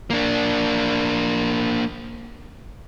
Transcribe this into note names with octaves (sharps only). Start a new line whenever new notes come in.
A#3 D4